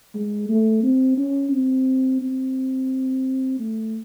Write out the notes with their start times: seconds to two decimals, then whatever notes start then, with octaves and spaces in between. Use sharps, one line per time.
0.15 G#3
0.49 A3
0.83 C4
1.18 C#4
1.53 C4
2.21 C4
3.59 A3